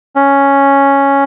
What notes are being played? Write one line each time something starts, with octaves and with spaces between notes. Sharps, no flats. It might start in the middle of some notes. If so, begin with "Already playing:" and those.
C#4